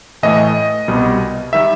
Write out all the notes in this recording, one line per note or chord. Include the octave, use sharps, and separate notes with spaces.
A2 E3 A3 D#5
C2 B2 G3
D#3 G3 E5